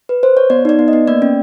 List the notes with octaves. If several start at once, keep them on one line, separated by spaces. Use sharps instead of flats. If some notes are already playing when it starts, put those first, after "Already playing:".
B4
C5
C#5
B3 D5
D#4 D5
B3
D#5
B3
A#3 D5
C#4